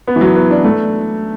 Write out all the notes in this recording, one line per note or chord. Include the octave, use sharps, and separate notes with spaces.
B3
E3
F#3
B3
D4
A3